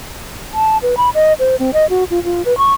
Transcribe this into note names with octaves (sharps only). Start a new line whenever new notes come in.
A5
B4
B5
D#5
C5
C4
D#5
F#4
F4
F4
B4
C#6